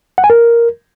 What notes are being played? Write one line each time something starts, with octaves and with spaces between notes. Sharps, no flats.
F#5
G#5
A#4